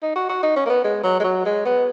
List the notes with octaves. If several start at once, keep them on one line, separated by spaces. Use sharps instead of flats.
D#4
F#4
F#4
D#4
C#4
A#3
B3
G#3
F#3
G#3
F#3
G#3
B3